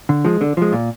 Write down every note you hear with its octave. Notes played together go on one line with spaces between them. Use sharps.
D3
F3 G#3
D3
F3 G#3
A#2